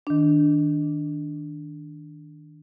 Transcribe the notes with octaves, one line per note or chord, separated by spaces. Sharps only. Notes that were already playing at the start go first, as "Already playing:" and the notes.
D#3 D4